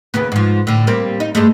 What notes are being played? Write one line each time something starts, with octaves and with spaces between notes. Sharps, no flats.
D#2 C#3 B3
G#2 F3
A2 D3
G3 A#3 C4
D#4
G2 G#3 A3